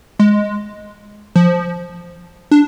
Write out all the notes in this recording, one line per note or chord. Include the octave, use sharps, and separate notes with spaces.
G#3
F3
D4